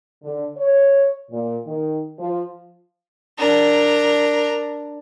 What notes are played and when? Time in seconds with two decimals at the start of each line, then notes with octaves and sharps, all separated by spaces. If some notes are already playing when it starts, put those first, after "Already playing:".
0.23 D3
0.57 C#5
1.31 A#2
1.66 D#3
2.18 F3
3.38 D4 A#4